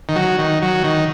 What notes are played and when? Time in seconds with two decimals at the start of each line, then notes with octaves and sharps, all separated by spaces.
0.09 D#3
0.16 F#3
0.38 D#3
0.62 F#3
0.84 D#3